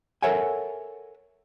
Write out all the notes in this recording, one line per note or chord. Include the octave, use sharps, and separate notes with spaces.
A4 A#4 C#5 E5 F#5 G#5